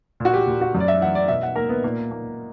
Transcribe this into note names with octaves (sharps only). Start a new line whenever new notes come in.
A#2 F#4
G4
A#2
F#4
F#2
D5
E5
E3 F#5
D5
B2 E5
F#5
A#3 A#4
B3
A#2 A#3
A#3